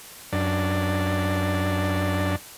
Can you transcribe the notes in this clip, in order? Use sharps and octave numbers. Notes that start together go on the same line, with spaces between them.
F#2 D4